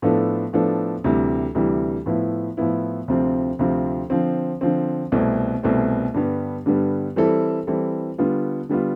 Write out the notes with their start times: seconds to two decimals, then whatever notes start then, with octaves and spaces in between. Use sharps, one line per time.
0.02 A2 F3 B3 D4 A4
0.53 A2 F3 B3 D4 A4
1.04 D2 C3 E3 G3
1.55 D2 C3 E3 G3
2.06 A2 F3 B3 E4
2.57 A2 F3 B3 E4
3.08 D2 C3 F3 C4 F4
3.59 D2 C3 F3 C4 F4
4.10 D3 F3 C4
4.61 D3 F3 C4
5.12 C2 B2 A3 C4
5.63 C2 B2 A3 C4
6.14 G2 D3 G3 B3
6.66 G2 D3 G3 B3
7.16 E3 G3 C4 E4 A4
7.67 E3 G3 C4 E4 A4
8.18 D3 G3 B3 F4
8.69 D3 G3 B3 F4